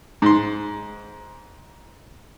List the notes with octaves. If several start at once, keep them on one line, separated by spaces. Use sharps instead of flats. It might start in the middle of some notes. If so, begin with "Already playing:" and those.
G#2 C6